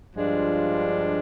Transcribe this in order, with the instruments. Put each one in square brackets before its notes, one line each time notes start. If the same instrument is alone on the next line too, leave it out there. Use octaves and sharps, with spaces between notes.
[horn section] G2 F3 G#3 D4 F4